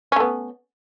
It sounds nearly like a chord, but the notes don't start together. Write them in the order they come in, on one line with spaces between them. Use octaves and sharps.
C#4 A3 B3